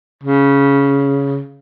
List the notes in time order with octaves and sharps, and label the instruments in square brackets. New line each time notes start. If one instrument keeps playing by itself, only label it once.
[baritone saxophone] C#3